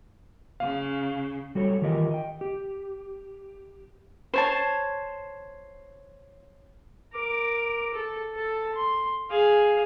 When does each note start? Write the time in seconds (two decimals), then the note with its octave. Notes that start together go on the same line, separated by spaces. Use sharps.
0.60 C#3 F5
1.55 G3 F#4 A4 C#5
1.82 D#3 E3 F4 G4 A#4 D#5
2.11 D#5 G5
2.41 G4
4.34 C5 C#5 A5
7.13 A#4 D6
7.94 A4
8.35 A4 A5
8.75 C6
9.30 G#4 F5